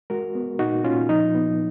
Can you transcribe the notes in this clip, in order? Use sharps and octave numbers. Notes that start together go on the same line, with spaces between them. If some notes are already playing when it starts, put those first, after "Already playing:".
G#3 F#4 A#4
B3
A#2 D#4 F#4
A#2 C#4 F4
F3 D#4
B3